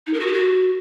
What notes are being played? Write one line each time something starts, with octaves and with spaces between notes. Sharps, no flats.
D#4
A#4
F#4
G4
F#4